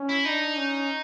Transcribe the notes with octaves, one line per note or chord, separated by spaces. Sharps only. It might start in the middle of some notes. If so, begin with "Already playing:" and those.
Already playing: C#4
E4
D4 D#4
C#4